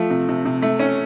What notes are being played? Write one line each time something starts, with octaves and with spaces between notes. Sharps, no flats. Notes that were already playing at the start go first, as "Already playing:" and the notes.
Already playing: F3 A3
C3
C3
C3
A3
C#4